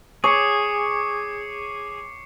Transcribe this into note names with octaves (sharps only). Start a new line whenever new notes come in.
G#4 C#5 D6 C7 C#7